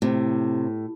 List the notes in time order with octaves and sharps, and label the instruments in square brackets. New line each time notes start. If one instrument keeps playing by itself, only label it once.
[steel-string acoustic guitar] A2 [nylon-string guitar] C3